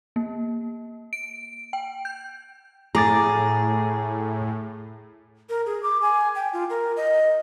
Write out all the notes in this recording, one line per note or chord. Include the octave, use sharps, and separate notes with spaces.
A#3
D7
G5
G6
A2 G#4 A#5 D6 A6
A#4
G#4
D6
G#5
G5
F4
A#4
D#5